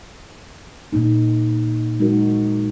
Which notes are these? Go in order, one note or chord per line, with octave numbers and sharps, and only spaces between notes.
A#2 A#3 D#4
G#3 D#4 F#4 A#4